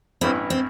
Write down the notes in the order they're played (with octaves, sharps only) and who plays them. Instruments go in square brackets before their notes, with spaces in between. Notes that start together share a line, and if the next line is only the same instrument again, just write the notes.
[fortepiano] A1 G2 E3 B3 E4 [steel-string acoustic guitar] C4
[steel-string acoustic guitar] C4